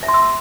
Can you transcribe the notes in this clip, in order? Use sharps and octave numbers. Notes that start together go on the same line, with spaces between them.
E5
C6
E6